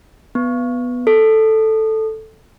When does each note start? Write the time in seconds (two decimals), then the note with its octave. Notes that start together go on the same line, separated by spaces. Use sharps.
0.35 B3
1.07 A4